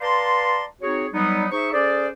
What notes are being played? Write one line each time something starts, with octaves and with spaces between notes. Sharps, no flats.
B4 D5 F5 A5 A#5 C6
C4 D#4 F#4 G#4 C#5
F#3 G3 B3 D#4
D#4 G#4 C5 E5 C#6
C#4 G#4 A4 C5 D5